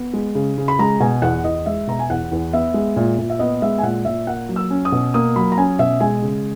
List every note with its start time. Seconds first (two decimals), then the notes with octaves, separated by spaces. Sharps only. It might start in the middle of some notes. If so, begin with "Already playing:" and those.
Already playing: B3
0.13 G#3
0.35 C#3
0.58 C#3
0.68 B5
0.79 G#3 A#5
1.00 B2 G#5
1.22 E2 F#5
1.44 E2 D#5
1.66 G#3 E5
1.87 B2 A#5
1.99 G#5
2.10 E2 F#5
2.32 E2
2.53 B3 E5
2.74 G#3
2.96 A#2
3.18 A#2
3.30 E5
3.39 B3 D#5
3.62 G#3 E5
3.78 G#5
3.83 A#2 F#5
4.05 A#2 E5
4.27 A#3 F#5
4.49 F#3
4.56 E6
4.70 C#4
4.85 D#6
4.92 B2
5.14 A#3 D#6
5.36 F#3 B5
5.52 A#5
5.57 C#4 G#5
5.79 B2 E5
6.00 G#3 G#5
6.22 C#3